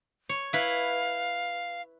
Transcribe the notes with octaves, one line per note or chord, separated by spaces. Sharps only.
C#5
E4 B4 F5